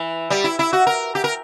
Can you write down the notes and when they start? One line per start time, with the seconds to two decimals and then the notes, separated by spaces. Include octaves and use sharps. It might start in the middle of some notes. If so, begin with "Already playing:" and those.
Already playing: E3
0.30 G3
0.44 E4
0.59 E4
0.73 F#4
0.87 A#4
1.15 G4
1.24 A#4